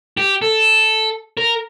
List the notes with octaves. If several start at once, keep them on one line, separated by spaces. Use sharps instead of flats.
G4
A4
A#4